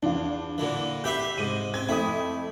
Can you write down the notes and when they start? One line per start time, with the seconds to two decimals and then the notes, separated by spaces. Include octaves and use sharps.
0.03 E2 D4 F4
0.58 A#2 D3 E3
1.04 G4 B4 E5 G6 C7
1.38 G#2 C3 D#7
1.74 C4 G#6
1.89 F2 A3 E4 D#6